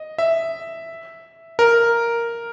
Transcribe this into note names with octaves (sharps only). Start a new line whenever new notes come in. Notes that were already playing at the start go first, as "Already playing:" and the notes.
Already playing: D#5
E5
A#4